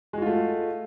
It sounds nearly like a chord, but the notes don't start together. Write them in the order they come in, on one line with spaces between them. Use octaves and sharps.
G#3 F#4 F4 A3